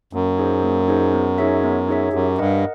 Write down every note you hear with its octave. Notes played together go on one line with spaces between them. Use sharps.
F#2 A#3
D#4 G#4 C5
A#3
D#4 G#4 C5
B3
D#4 G#4 C#5 E5
B3
D#4 G#4 C#5 E5
F#2 G4
G2 A#4 D#5 F#5